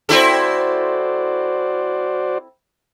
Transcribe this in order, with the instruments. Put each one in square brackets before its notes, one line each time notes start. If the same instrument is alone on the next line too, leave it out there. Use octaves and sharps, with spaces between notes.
[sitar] C4 E4 A4 [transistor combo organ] F#4 C5 D5